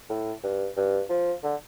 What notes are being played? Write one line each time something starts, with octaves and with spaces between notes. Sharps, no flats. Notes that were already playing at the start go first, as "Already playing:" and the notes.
A2
G2
G2
F3
D3